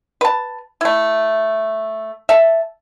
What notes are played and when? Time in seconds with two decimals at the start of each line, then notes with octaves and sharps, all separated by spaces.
0.21 B4 A5
0.81 A3 E4
2.29 E5 A5